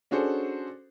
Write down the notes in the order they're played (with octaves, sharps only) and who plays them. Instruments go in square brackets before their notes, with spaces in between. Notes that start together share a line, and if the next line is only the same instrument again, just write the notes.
[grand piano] C#4 D4 F#4 G#4 A4 C5